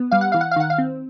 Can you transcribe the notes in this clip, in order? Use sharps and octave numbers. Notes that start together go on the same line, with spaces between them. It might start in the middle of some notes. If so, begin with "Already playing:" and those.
Already playing: B3
G3 F5
F#5
E3 F5
F#5
F5
D#3 F#5
F5
C4